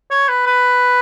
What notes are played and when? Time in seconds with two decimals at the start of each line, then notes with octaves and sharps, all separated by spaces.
0.11 C#5
0.29 B4
0.47 B4